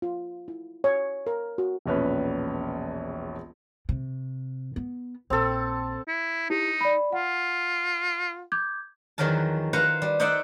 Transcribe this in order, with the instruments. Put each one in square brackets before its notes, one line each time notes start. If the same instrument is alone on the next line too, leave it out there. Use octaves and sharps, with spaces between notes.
[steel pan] F4
E4
C#5
A#4
F#4
[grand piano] E1 A#1 C#4 B4
[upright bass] C3
B3
[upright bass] A#1 [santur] C4 A4
[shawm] E4
[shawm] D#4 [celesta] E4 G4
[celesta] D5 B5
[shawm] F4 [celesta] F#5
[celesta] D6 G6 G#6
[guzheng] E2 D#3 F3 F#3 A#4 A5
B4 C5 F5 F#5 A#5
G3
D#4 C5 D5 E5 F#5